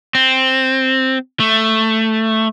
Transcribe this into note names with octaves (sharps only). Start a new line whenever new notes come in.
C4
A3